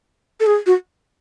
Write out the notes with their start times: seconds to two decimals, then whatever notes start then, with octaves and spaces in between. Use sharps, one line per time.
0.40 A4
0.47 G#4
0.66 F#4